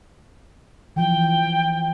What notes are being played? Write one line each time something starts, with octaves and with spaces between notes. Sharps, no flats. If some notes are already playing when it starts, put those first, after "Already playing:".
E3 F3 G5